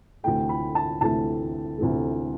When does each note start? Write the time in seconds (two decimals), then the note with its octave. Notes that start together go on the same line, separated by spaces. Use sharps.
0.24 D2 C3 E3 A3 G5
0.49 B5
0.75 A5
1.01 D2 C3 E3 A3 A5
1.78 D2 C3 E3 A3